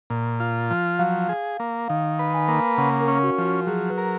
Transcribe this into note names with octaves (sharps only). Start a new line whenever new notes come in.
A#2
F4
F3
F#3 F5
G#4
A#3
D#3 F5
B4
G#5
A#3
C#3 F#5
A#4
C#4
F#4
F3
F#4
F#3 G#4
B4
A#4